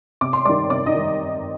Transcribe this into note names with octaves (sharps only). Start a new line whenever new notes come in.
C3 D6
C6
D#3 G3 D5 D6
C3 D5 D6
D#4 D#5
D#3 G3